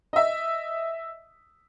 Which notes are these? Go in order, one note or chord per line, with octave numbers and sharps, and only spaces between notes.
D#5 E5